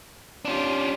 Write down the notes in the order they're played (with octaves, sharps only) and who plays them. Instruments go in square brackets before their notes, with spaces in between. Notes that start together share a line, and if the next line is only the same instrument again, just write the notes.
[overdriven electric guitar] C#4 D4 [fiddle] F4 G4